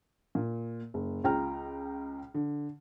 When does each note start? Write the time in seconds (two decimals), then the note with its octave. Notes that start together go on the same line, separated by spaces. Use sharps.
0.35 A#2
0.94 F#1
1.24 C#2 F4 G5 A#5 F6
2.34 D3